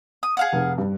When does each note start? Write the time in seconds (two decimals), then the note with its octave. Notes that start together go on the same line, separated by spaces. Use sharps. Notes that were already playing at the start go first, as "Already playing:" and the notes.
0.23 D#6
0.37 G#4 F5 F#5
0.53 F1
0.78 G2